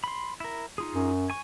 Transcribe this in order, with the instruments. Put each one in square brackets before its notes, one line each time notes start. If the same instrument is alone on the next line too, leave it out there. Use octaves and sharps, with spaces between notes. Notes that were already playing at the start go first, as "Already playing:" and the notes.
[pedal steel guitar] B5 C6
E4 A#4
D#4 F4 G#4
[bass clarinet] F#2
[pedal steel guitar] G#5 C#6